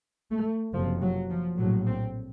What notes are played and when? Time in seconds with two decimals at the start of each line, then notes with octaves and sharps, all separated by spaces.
0.31 A3
0.73 F#1 F2 C3 F3
1.01 F#3
1.30 F3
1.57 A#1 A2 F#3
1.86 C4